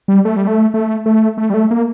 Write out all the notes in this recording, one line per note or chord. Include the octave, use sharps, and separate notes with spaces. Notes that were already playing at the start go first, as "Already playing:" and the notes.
G3
A3
G3
A3
A3
A3
A3
G3
A3
A#3